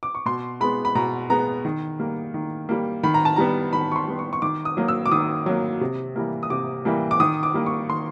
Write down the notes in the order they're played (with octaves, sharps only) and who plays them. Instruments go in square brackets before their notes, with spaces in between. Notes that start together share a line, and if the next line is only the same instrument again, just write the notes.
[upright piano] D6
C#6
B2 C6
G#3 B3 B5
B5
B2 A#5
G#3 B3 A#5
D#3
G3 A#3
D#3
G3 A#3
D#3 B5
A#5
A5
G3 B3 A#5
D#3 B5
C#6
C6
G3 B3
C#6
C#6
D#3 D6
D#6
F#3 A#3
E6
D6
D#3 D#6
F#3 A#3
C3
E3 G3 A#3
D#6
C3 D6
E3 G3 A#3
D6
D#3 D#6
D6
G3 A#3
C#6
D#3 C6